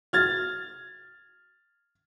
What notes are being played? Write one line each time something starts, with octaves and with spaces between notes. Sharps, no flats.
F6 G#6 A6